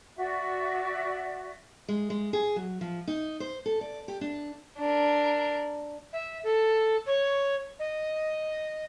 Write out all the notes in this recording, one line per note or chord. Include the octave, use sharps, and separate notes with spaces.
F#4 D5 E5
G#3
G#3
G#4
F#3
F3
D#4
C5
A4
D5
G4
D4
D4 A#4
E5
A4
C#5
D#5